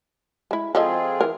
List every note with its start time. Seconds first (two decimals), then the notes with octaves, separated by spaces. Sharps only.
0.51 G#3 E4
0.75 F3 C4 F4 G#4 A4 D#5
1.21 E3 A#4